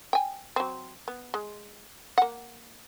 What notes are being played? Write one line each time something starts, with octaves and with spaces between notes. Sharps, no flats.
G5 G#5
F#3 C4
B3
G#3
A#3 F#5